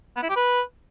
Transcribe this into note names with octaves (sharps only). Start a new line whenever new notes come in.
B3
E4
G4
B4